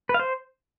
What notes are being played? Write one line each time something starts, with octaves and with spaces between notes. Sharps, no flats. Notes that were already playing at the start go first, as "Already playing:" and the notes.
B4
F5
C5